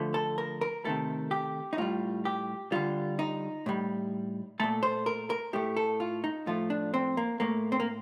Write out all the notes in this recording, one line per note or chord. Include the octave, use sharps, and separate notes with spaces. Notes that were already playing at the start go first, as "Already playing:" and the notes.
Already playing: D3 F3 A3
A4
A#4
A#4
C3 D#3 A3 A4
G4
D#4
A2 G3 F4
G4
D3 G3 F4
D#4
A2 G3
A#2 A3 A4
C5
A#4
A#4
A2 A3 G4
A4
F4
D#4
A2 F3 A3 F4
D4
C4
A#3
A2 A3 A#3
C4
A#3